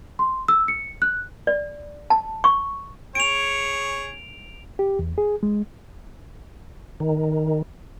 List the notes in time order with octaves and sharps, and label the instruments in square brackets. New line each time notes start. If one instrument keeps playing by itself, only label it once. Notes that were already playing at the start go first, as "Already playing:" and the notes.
[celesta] C6
E6
C#7
F#6
[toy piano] D5
A5
C#6
[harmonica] G#4 C#5 [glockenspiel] D7 F7
[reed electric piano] G4
E2
G#4
G#3
[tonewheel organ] D#3